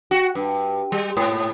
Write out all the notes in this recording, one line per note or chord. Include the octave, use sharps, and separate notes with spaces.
F#4
G2
G3
G#2